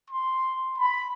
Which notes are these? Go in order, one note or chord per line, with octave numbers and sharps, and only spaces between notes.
C6
B5